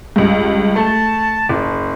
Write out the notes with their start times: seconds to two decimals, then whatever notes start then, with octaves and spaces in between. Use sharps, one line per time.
0.16 C#2 G2
0.76 A3 A5
1.49 F#1